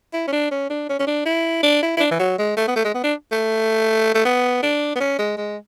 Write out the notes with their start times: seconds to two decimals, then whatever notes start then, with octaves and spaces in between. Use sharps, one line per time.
0.13 E4
0.27 C#4
0.32 D4
0.51 C#4
0.70 D4
0.89 C#4
0.99 C#4
1.07 D4
1.26 E4
1.63 D4
1.82 E4
1.97 E4
2.00 D4
2.11 E3
2.19 F#3
2.38 G#3
2.57 A3
2.68 B3
2.76 A3
2.85 G#3
2.94 B3
3.04 D4
3.32 A3
4.14 A3
4.25 B3
4.63 D4
4.95 B3
5.00 C#4
5.18 G#3
5.37 G#3